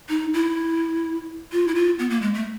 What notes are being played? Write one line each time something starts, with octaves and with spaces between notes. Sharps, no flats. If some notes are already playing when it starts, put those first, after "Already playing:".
D#4
E4
F4
E4
F4
B3
A#3
G#3
A3